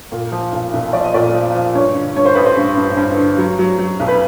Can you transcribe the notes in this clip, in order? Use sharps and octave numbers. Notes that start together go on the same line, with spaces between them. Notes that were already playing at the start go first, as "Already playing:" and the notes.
A#2
F3
B1
B1
F3 D5
D#5
A#2 D5
F3
F3
G2 C#5
D3
G2 C#5
C5
A1 B4
C5
G2
G2
G2
D3
F#3
F#3
F#3
B1
B4